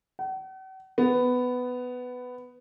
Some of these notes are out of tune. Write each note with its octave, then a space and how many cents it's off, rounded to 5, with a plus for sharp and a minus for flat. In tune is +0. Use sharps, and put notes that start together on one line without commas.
F#5 +45
B3 +10